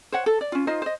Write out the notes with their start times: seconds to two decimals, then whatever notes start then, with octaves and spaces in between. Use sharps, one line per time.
0.12 C5 C#5 F#5
0.26 A4
0.41 D5
0.52 C#4 F4
0.67 D#4 F4 C5 D#5
0.82 C5 D#5